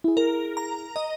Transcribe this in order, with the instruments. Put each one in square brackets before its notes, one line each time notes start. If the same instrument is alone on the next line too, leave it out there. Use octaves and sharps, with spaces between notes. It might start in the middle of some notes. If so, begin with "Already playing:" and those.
[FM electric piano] E4 G#4
[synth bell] A#4
A#5
D#5